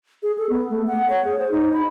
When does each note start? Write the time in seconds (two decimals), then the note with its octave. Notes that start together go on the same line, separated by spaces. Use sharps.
0.23 G#4
0.38 A4
0.49 B3
0.70 A3
0.87 F#5
1.10 C#5
1.25 G#4
1.39 C5
1.51 D#4
1.73 B5